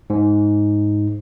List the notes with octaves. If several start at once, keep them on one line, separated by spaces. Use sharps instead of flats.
G#2